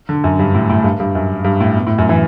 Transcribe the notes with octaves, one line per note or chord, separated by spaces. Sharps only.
D3
F#2
G2
A2
A2
G2
G2
F#2
G2
A2
B2
A2
F#2
E3